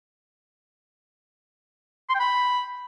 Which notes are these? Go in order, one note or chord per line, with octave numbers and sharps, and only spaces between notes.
C6
G5
B5